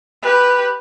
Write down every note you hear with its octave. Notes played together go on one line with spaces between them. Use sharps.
G4 B4